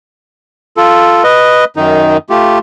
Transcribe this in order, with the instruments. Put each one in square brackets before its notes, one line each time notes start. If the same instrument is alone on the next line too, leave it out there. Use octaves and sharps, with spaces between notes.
[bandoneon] F4 A4
B4 D#5
F#2 D#3 D#4
A3 F4 G4